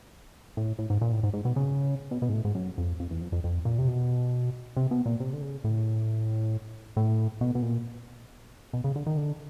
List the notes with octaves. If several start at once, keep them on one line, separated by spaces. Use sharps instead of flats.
A2
A2
G#2
A#2
A2
G#2
G#2
B2
C#3
B2
B2
G#2
A2
G#2
F#2
F2
F2
E2
F2
F2
F2
A#2
C3
B2
C3
B2
A#2
C3
D3
C#3
A2
A2
B2
B2
A#2
B2
C#3
D3
D#3
D3